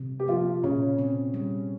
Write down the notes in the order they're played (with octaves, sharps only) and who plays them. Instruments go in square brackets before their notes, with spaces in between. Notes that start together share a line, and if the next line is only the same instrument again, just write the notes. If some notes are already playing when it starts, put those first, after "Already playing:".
Already playing: [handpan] C3
[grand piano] G4
[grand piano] F3 F4 [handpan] A#3
[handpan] A#2 [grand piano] C#3 C#4
[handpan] C4
G3